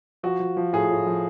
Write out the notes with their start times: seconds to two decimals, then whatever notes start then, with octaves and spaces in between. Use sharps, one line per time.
0.23 F3 F#4
0.40 F3
0.57 F3
0.73 A2 G#4
0.90 A2
1.06 F3